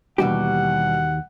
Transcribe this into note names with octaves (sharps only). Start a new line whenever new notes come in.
D#2 B2 E3 G3 F#4 G4 F#5